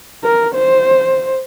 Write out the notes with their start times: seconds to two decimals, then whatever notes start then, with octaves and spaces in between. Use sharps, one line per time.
0.24 A#4
0.55 C5